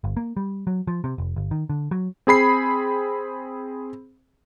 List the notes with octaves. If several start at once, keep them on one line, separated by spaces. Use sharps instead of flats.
G1
A#3
G3
F#3
F3
C3
F1
G1
D#3
D3
F#3
C4 G#4 B5 C7